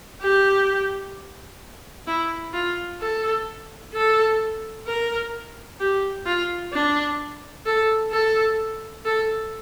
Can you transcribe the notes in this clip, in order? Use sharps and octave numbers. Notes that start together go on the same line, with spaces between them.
G4
E4
F4
A4
A4
A#4
G4
F4
D4
A4
A4
A4